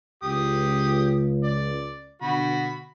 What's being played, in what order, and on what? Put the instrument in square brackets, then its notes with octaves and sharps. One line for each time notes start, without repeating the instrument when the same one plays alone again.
[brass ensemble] C#2 [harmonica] G4 D#6
[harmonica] D5
[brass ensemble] B2 D3 [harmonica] F#4 B5